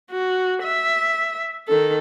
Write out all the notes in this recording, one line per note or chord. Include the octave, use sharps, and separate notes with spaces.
F#4
E5
D#3 A4